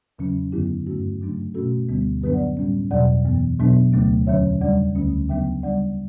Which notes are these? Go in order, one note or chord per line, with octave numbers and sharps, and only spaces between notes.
E2 C#3 F#3 C#4
F#2 D3 F#3 B3 E4 G4
G2 D3 A3 C#4 F#4
F#2 C#3 F#3 A3 D4
B2 A3 C#4 F#4 A4
D2 D3 G3 B3
F#2 D3 F#3 B3 D4 G4 B4
D5 F#5
A2 G3 C#4
E2 B2 F#3 D5 F#5
F#2 E3 B3
B2 F#3 B3 D4
D2 C#3 F#3 A3 D4
E2 D3 F#3 C#4 C#5 E5
E2 C#3 G3 D4 D5 F#5
D2 D3 A3 C#4
C#3 F#3 B3 D4 E5 G5
C#3 G3 D4 D5 F#5